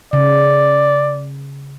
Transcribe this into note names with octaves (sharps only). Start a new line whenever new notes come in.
C#3 D5